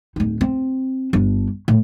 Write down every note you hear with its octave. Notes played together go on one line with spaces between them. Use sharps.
D1 D#4
C4
G1 D4
A2